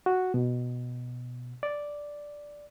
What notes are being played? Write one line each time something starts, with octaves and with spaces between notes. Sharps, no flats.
F#4
B2
D5